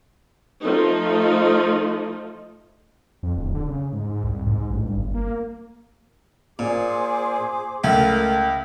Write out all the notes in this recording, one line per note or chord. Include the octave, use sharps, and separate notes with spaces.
F3 A3 D#4
F2
D1
D3
C#3
G#2
G#2
C2
G#2
A1
G2
G1
A#3
A#2 G#4 C5 D6
C#2 A3 A#4 F6